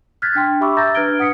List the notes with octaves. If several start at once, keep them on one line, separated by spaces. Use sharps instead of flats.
F6 F#6 G#6 A6 B6
D4 G5 C6
G4 E5 B5 C#6 D6 E6
E5 A#5 E6 G6 A6 A#6
D4 B4 F6 G#6 D7 G7
F#5 D#6 B6 C#7